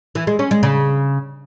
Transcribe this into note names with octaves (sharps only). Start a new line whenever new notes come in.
E3
G#3
C#4
G#3
C#3